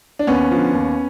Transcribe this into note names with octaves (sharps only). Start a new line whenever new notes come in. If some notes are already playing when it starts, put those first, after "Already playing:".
D4
D#2 B3 C#4
D3 F3
D#2